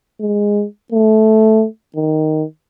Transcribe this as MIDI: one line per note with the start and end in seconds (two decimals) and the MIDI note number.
0.20 0.65 56
0.92 1.66 57
1.96 2.44 51